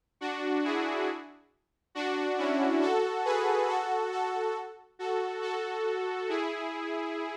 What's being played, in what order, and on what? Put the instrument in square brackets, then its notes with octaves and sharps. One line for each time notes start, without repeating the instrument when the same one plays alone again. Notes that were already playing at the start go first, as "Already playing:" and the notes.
[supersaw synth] D4 F#4
E4 G#4
D4 F#4
C#4 E4
F#4 A4
G#4 B4
F#4 A4
F#4 A4
F#4 A4
F#4 A4
E4 G#4